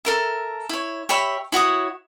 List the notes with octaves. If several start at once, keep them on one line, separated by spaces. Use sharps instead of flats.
A4 A#4 E5
E4 C#5
G4 C#5 E5 B5
E4 F#4 C#5 D#6